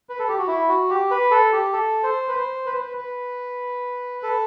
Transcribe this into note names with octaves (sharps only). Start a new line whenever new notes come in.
B4
A4
G4
F#4
E4
F#4
G4
B4
A4
G4
A4
C5
B4
C5
B4
C5
B4
B4
A4